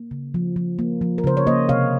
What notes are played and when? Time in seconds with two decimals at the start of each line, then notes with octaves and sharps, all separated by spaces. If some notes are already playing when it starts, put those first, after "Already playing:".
Already playing: A#3
0.11 C#3
0.34 F3
0.56 F3
0.79 A#3
1.01 F3
1.18 A#4
1.24 C#3 C5
1.37 C#5
1.47 A#3 C5 D#5
1.69 C3 C#5 F5